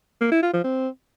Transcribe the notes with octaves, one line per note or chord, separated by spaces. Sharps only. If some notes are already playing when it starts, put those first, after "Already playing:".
A#3
E4
F4
F3
C4